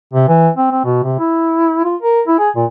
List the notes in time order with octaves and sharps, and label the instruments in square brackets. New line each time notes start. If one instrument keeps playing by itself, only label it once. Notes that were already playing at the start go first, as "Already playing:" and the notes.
[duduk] C3
E3
C4
C4
B2
C3
E4
F4
A#4
E4
G#4
A#2